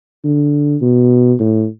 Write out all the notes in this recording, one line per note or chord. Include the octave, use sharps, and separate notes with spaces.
D3
B2
A2